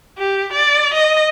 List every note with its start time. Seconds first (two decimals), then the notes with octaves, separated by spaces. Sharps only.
0.18 G4
0.53 D5
0.94 D#5